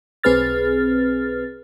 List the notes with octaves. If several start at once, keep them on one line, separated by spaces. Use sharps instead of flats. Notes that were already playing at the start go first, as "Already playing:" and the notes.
B1 C4 G#4 B4 F6 A6